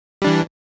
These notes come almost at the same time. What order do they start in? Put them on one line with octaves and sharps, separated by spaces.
G3 D4 E3